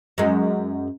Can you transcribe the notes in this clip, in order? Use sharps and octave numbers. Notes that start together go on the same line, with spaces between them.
F#2 G#3